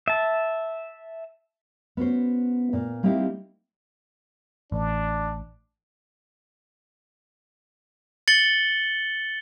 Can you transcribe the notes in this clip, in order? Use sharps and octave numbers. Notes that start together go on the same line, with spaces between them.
E5 A5
B3 C#4 F#4 C5
A#2 F4
G3 A#3 C4 D#4 E4 G4
A1 D4
A6 C#7 F#7 G7